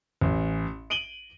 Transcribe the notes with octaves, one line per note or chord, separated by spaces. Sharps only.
A1
D7 D#7 F#7 G7